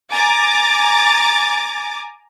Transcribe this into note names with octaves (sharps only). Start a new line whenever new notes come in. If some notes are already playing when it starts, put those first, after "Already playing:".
G#5 A#5 D6 A6